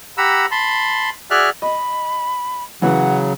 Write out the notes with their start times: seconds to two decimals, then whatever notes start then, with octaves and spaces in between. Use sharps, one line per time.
0.18 G4 F#5 A#5 B5 E6
0.51 A5 B5 C6
1.31 F#4 G#4 D5 E5 F6 F#6
1.62 D#5 B5
2.82 C#3 E3 F#3 C#4 B4 F#5